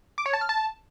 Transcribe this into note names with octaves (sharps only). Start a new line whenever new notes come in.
D6
C#5
A5
F6
A5